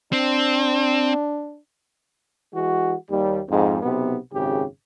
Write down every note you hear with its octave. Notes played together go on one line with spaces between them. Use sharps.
C4 D4
E3 G#3 F#4
D#2 G3
F2 G#2
B1 C3 B3
G#1 F#2 C#3 G4